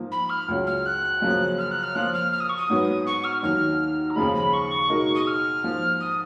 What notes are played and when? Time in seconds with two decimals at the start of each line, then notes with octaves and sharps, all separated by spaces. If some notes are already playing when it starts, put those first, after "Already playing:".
Already playing: G#2 F3 A#3
0.11 B5
0.29 F6
0.48 C#2 C#3 F#3
0.67 F6
0.86 F#6
1.22 F#2 C#3 F3 A#3
1.58 F6
1.71 F#6
1.83 F6
1.95 F3 A#3 F4 F#6
2.13 F6
2.32 F6
2.40 D#6
2.49 C#6
2.57 D#6
2.70 G#2 F#3 B3
3.06 C#6
3.24 F6
3.43 D#2 D#3 F#3 F6
4.10 A#5
4.16 D#2 C#3 F3 G#3 B5
4.35 B5
4.53 C#6
4.89 B2 G#3 D#4 A#4
5.15 D#6
5.27 F6
5.64 G#2 F3 A#3
6.00 D#6